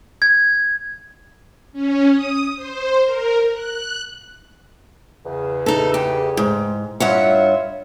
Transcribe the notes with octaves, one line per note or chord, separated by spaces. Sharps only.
G#6
C#4
D#6
C5
A#4
F#6
E2 C#3
D#4 A4
G4
G#2
G2 F4 C#5 E5 F#5